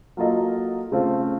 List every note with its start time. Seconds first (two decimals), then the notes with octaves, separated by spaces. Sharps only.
0.17 F#3 A#3 F4 A4 D#5
0.92 C#3 A3 C4 F4